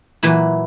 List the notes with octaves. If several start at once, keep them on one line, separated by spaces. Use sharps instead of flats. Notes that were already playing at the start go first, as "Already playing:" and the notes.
A#2 E3 F#3 E4